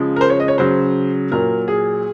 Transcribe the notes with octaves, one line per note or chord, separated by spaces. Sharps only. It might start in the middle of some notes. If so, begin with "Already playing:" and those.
Already playing: C#3 F3 G#3
A#4
C5
C#5
D#5
C#5
C#3 F#3 C5
A#2 F#3 A#4
G#4